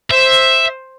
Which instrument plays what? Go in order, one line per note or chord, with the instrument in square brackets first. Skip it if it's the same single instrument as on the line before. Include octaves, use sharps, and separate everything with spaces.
[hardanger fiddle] C5 [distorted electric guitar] E5